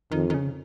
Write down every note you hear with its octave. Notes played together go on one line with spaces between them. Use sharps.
F2 D#3
D#3
C#3